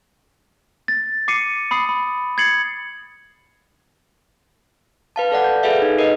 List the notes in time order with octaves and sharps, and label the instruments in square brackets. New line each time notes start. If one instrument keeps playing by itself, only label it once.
[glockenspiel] A6
D6 C7 C#7 D#7
B5 D#6 C7
B5
G#6 A6 C7 C#7 F#7
[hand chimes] B4 F5 A5
A4 D5 F#5
G6
G#4 A4 B4 E5 F5
D#4
A#4 B4 D#5